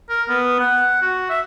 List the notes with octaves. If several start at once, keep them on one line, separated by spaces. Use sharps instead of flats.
A#4
B3
F#5
F#4
E5